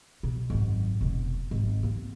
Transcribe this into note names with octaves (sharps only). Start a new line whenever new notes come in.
B2
G#1 F#2
F1 B2
G#1
A#3 C4